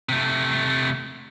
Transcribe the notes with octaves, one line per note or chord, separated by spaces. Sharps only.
C3 A3